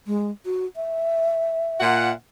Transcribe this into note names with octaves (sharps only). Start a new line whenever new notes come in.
G#3
F#4
E5
A#2 F#5